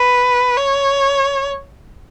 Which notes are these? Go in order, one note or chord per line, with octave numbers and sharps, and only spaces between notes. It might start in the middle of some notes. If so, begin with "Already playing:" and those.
Already playing: B4
C#5